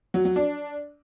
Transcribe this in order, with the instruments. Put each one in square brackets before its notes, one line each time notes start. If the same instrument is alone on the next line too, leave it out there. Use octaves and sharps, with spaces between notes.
[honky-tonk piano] F#3
F#3
D4